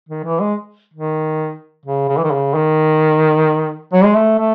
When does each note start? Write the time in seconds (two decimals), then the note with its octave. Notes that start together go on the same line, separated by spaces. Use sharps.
0.09 D#3
0.25 E3
0.40 G#3
0.94 D#3
1.86 C#3
2.09 C#3
2.17 E3
2.24 D#3
2.32 C#3
2.54 D#3
3.93 F#3
4.04 G#3
4.16 A3
4.39 A3